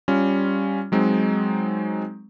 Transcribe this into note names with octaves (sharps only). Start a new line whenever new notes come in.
G3 C#4 F4
F#3 G#3 C4 D#4